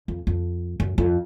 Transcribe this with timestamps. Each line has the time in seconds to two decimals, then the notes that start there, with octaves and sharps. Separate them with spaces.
0.08 F2
0.27 F2
0.80 F#2
0.98 F2